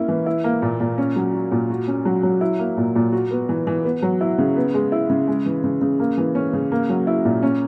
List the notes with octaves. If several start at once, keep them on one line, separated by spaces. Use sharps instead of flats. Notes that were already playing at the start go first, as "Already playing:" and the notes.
Already playing: A#3 C#4 E4
E3
E4
A#3
A#2
A#2
C#4
F#3
F#4
A#2
F#4
C#4
F#3
F#3
E4
A#3
A#2
A#2
F#4
B3
E3
E3
B3
F#3
E4
C#3
B3
G#3
E4
C#3
G#3
E3
C#3
C#3
A#3
E3
C#4
C#3
A#3
F#3
E4
A#2
C#4